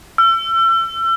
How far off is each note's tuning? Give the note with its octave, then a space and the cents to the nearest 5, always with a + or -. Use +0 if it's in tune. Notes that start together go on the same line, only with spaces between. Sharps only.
E6 +35